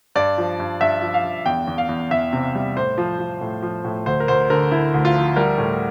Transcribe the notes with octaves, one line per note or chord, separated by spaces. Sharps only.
G2 D5
F3
G2
G2 E5
F3
F5
G2
E2 G5
E2
F5
E2
E2 E5
C3
G3
A2 C5
F3
F3
A2
F3
A2
D2 C5
A#4
D2 C5
D3 A#4
D3 E4
D2
F4
F3
G3 A#4
A2